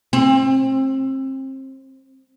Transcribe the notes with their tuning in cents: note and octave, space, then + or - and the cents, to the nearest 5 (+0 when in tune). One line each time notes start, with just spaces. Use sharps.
C4 +30